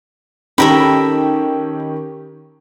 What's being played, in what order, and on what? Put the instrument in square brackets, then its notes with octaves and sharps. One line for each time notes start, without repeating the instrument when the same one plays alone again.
[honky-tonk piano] D#3 C#4 G4 [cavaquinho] A4 A#4 B5